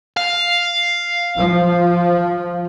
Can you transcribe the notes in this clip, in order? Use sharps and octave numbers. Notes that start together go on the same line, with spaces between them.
F5
F3